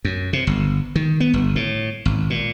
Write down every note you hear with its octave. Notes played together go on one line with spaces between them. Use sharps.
F#2
C3
G1
D#3
B3
G1
A2
G#1
A#2